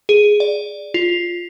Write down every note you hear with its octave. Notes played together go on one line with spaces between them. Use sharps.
G#4
D5
F4